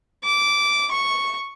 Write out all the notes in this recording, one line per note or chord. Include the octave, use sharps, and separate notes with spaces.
D6
C#6